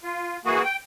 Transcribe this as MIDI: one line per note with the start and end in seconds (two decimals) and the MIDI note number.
0.03 0.37 65
0.45 0.63 52
0.45 0.63 58
0.45 0.63 66
0.45 0.63 68
0.63 0.76 79